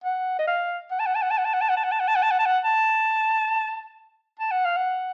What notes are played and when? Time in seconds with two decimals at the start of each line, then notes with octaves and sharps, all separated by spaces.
0.04 F#5
0.39 D#5
0.47 F5
0.91 F#5
0.99 A5
1.06 F#5
1.15 A5
1.22 F#5
1.30 A5
1.38 F#5
1.45 A5
1.53 F#5
1.61 A5
1.69 F#5
1.77 A5
1.84 F#5
1.91 A5
2.00 F#5
2.08 A5
2.15 F#5
2.23 A5
2.31 F#5
2.39 A5
2.45 F#5
2.65 A5
4.39 A5
4.51 F#5
4.65 F5
4.77 F#5